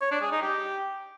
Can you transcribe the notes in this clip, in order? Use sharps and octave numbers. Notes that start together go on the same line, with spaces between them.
C#5
D4
G#4
D#4
G4